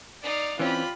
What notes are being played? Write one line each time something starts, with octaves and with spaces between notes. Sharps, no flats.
D#4 D5 F5
E3 C4 C#4 F4 G4 B5